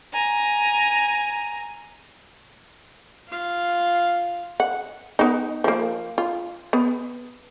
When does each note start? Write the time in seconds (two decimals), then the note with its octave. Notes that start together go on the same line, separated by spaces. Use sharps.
0.13 G#5 A#5
3.28 F4 F5
4.60 F#5
5.19 B3 D#4
5.64 F3 A#3
6.18 F4
6.73 B3